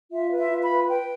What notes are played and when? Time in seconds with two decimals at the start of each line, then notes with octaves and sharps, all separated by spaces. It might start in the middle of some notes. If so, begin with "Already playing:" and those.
0.11 F4 E5
0.31 B4
0.38 E5
0.51 F4
0.63 B5
0.69 B4
0.88 B4 G5